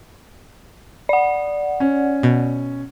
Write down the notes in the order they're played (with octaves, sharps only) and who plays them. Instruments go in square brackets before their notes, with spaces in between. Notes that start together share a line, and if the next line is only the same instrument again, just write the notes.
[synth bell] D5 F#5
[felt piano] C#4
[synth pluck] B2